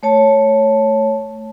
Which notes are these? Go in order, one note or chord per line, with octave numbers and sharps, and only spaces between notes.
A3 C#5 A5